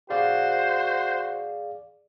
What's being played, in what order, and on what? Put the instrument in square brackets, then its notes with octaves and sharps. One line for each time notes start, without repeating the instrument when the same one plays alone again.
[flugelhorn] F#4 [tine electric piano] G#4 D5 F5 [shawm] C5